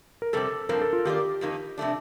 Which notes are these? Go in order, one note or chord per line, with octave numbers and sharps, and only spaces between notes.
A#4
F2 C3 G3 C4 A4
G2 F3 C4 A#4
A4
F4
D#3 A#3 F4 G4 A#4 D5
F2 D#3 A#3 D#4
C3 F3 A3 D4